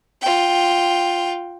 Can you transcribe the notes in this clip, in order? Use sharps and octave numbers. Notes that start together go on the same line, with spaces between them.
F4 G5